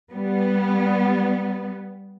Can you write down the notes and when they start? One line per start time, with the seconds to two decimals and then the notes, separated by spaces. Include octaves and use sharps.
0.12 G3 B3